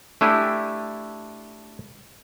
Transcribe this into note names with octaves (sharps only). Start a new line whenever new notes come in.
A3 D4 E4 G4 G#5